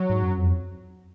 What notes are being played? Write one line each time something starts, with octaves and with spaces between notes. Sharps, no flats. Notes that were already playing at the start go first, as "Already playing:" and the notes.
Already playing: F#3
G#2
F#2
F2